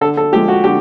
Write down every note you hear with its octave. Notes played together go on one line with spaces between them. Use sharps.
D3 A4
A4
F3 G#3 G4
F#4
D3 G4